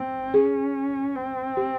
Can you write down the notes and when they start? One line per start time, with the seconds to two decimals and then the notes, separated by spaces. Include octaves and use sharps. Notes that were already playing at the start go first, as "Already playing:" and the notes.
Already playing: C4
0.34 C#4 G#4
1.16 C4
1.57 G4